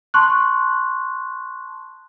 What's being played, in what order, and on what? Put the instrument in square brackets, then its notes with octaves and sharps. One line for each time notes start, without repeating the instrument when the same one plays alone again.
[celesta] A5 C6 C#6 F#6